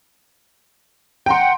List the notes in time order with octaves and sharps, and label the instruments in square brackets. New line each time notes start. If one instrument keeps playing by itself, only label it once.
[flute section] F#5 [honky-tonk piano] G5 A#5 C6